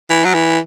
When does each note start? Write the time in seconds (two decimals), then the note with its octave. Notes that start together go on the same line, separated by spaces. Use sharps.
0.10 E3
0.25 F#3
0.34 E3